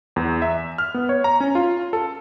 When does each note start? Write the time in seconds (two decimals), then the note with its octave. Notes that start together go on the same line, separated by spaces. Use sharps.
0.16 E2
0.42 E5
0.78 F6
0.94 B3
1.09 C#5
1.24 A#5
1.40 C#4
1.55 F4
1.93 A4